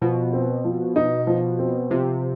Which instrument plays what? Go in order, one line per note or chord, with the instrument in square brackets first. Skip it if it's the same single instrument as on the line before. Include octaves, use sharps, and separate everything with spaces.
[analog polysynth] B2 [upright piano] F3
[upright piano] C4
F3
D#4
F3
C4
[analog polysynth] C3 [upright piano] F3